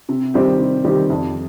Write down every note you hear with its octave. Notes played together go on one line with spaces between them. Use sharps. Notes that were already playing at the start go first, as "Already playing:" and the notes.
C3
D#3 G3 C4 G4
C3
D#3 G3 C4 G4
F2